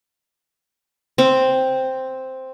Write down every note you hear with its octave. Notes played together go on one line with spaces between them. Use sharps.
C4